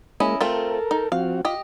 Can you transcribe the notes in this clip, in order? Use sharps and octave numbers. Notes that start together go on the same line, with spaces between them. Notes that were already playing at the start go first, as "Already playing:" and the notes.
G#3 A#3 C#4 E4 D#5
A3 C4 F4 A4 A#4
D#4
F3 C4 F#4 F5
F4 G4 D#5